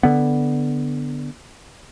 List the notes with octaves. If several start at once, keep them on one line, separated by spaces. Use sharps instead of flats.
D3 B3